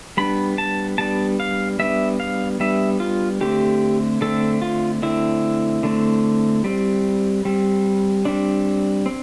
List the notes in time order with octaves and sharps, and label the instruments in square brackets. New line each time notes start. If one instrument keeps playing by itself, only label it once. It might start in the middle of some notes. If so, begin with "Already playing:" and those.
[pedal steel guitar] G3 B3 D4 B5
A5
G3 B3 D4 A5
F5
G3 B3 D4 E5
F5
G3 B3 D4 E5
F4
D3 A3 C4 G4
D3 A3 C4 A4
F4
D3 A3 C4 E4
D3 A3 C4
G3 C4
G3 C4
G3 C4 D4
C4